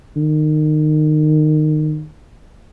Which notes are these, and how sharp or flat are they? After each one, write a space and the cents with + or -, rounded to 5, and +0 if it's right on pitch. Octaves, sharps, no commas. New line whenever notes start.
D#3 -25